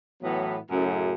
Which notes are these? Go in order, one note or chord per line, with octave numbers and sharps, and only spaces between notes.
A2 E3 F#3 B3
F#2 A2 C#3